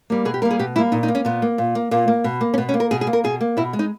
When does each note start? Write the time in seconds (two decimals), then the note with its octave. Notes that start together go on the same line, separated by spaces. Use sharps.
0.10 G3 A#3
0.25 B2 G#4
0.34 G4
0.42 G3 A#3 A#4
0.51 G#4
0.59 B2 G4
0.76 G3 E4
0.78 A#3
0.92 A#2 D#4
1.03 D#4
1.08 A#3
1.15 C#4
1.25 A#2 B3
1.42 A#3
1.58 A#2
1.75 A#3
1.91 A#2 A#3
2.08 A#3
2.24 B2
2.41 A#3
2.54 C#4
2.58 B2 B3
2.69 C#4
2.74 A#3
2.80 A#4
2.91 B2 G#4
3.01 G#4
3.07 A#3
3.13 A#4
3.24 B2 G#4
3.41 A#3
3.57 B2 E4
3.73 G#3
3.79 D#4